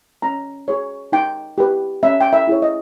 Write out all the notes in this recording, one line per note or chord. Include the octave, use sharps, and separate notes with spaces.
C#4 A#5
G#4 C#5
D#4 G5
G4 B4
C#4 E5
G5
E5
E4 G#4 C#5
D#5